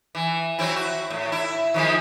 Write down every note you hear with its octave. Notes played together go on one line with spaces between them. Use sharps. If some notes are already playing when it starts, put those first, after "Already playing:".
E3
F#3 C4 E4
F#4
A2
E4
D#3 F3 G#3